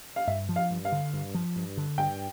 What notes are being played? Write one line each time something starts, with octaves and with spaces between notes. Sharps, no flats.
F5
G2 E5
F3
F5
G2
F5
D3
G2
F3
G2
D3
G2 G5